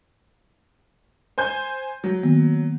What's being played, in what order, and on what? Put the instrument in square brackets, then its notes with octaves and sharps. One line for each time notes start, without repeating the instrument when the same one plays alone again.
[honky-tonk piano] C5 G#5 G6
F#3
[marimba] D#3 A#3 B3